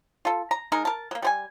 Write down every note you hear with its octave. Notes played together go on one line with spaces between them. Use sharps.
F4 A4
A#5
G#3 D#4 A#4
A#4 A5
F#3 A#3
G3 C5 G#5